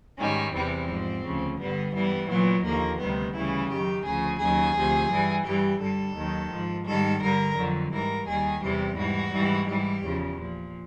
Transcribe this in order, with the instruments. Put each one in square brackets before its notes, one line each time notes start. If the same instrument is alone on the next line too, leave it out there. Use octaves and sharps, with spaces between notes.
[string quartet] G#2 D#3 G3 C#4
E2 C3 E3 G3 C4
G#2 F3
D2 C#3 F3
G2 D3 G3 B3
G2 E3 G3 B3
A#2 F#3 B3
D#2 D3 F3 A#3
D2 C3 D#3 G3 B3
D2 C#3 E3 G3 E4
F#2 D#3 F#3 G4
D2 C#3 F3 G#4
D#2 C#3 F#3 G#4
D2 C3 F3
G2 E3 G3
G2 E3 G3 G4
G2 D3 G3 A4
D#2 D#3 F#3
G#2 F3
G#2 D#3 G3 A4
G2 D3 G3 A#4
F2 D3 F#3
G#2 E3 G3 A#4
D#2 D#3 G3 G#4
E2 C3 E3 G3 G4
G#2 E3 G3 F#4
G#2 E3 G3
G#2 E3 G3 G4
E2 C#3 F3
A#2 F3